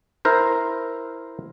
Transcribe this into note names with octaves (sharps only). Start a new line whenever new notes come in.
E4 A#4 C5